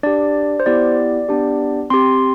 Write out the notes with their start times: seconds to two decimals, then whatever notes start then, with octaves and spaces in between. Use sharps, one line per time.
0.03 D4 G4 D5
0.60 C5
0.66 B3 E4 G4 D5
1.29 B3 D4 G4
1.90 C4 G4 C6